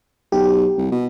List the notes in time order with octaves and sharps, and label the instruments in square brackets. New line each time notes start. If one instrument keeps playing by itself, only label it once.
[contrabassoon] B1 [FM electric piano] G4
[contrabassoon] C2
B2